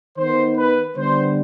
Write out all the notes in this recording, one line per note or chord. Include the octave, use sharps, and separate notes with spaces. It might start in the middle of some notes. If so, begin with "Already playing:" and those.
D#3 B3 C5
B4
D3 G3 B3 C5